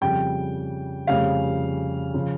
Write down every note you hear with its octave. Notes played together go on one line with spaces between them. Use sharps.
F2 C#3 G3 G5
F1 F2 C#3 G3 C#4 F5
C#3 F3